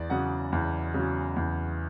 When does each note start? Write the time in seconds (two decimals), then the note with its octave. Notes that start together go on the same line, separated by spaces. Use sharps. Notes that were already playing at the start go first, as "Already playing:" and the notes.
Already playing: E2 D5
0.10 C#3 F#3 F#5
0.52 E2
0.94 C#3 F#3
1.36 E2